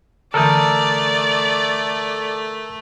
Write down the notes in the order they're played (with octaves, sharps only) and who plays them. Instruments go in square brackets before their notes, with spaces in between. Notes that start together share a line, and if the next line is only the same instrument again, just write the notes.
[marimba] D3 E3 [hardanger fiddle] A3 [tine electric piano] A4 A#4 D#6 [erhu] D5